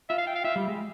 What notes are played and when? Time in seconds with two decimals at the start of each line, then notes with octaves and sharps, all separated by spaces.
0.09 F4 E5
0.18 F5
0.27 G5
0.36 F5
0.44 F4 E5
0.56 G3
0.68 G#3